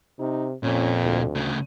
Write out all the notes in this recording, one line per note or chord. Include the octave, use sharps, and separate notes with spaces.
C3 D#4
F2 A#2 C#4
D2
C#3 A3